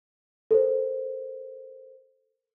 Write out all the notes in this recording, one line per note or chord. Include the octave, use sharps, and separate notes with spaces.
A4 A#4 C5